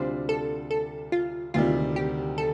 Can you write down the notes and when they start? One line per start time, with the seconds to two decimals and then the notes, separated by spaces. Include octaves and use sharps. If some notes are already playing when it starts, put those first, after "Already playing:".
Already playing: D2 C3 G3 D4 F4 C5
0.29 A4
0.71 A4
1.12 F4
1.54 D2 C3 D#3 G3 F4
1.96 G4
2.38 A4